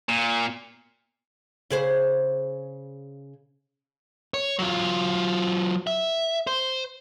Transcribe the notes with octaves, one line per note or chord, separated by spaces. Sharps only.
A#2
C#3 G#4 C5
C#5
F#3 F4
E5
C5